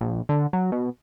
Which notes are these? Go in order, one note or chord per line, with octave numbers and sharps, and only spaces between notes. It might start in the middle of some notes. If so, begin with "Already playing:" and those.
A#1
D3
F#3
B2